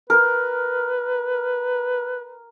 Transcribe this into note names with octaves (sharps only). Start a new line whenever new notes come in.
A#4 B4